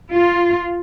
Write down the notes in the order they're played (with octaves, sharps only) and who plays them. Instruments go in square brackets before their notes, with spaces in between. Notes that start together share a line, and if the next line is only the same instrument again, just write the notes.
[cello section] F4